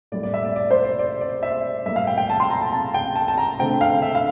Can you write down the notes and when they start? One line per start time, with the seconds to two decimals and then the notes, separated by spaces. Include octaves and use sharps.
0.12 A2 G3 A#3 D5
0.23 D5
0.34 E5
0.45 D5
0.56 D5
0.71 C5
0.84 D5
0.99 D5
1.21 D5
1.43 E5
1.86 A2 G3 A#3 E5
1.96 F5
2.07 G5
2.18 G5
2.30 A5
2.40 C6
2.50 A#5
2.61 A5
2.73 A5
2.94 G5
3.16 A5
3.28 A5
3.38 A#5
3.59 D3 A3 C4 G5
3.81 F5
4.02 E5
4.15 F5